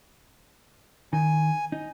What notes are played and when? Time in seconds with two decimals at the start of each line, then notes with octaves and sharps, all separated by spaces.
1.13 D#3 G#5
1.72 D#4